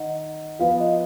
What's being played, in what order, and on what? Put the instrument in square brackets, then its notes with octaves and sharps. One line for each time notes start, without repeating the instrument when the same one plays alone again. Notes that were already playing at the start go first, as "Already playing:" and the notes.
Already playing: [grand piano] D#3 D#4 [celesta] D#5 F#5
[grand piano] F3 B3 F4 [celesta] F5
[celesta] D#5